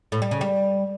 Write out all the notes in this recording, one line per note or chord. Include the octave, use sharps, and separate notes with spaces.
A2
G3
C#3
G3